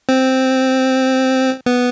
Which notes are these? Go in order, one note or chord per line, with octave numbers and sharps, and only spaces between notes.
C4
B3